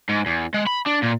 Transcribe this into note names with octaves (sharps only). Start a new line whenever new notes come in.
G#2
E2
G#3
B5
D4
A#2